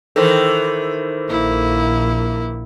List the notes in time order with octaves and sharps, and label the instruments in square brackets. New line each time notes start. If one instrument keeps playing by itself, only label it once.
[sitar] D#3 E3 [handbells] A4 A#4 C5
[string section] A#1 [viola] A#3 E4